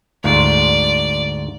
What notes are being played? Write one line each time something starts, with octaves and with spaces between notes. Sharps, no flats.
D2 G#2 F4 D5